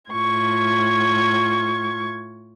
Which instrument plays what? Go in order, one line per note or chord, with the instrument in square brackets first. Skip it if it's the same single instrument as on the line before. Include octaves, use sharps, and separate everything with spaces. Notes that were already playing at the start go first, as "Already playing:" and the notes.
[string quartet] A2 F4 C#6 G#6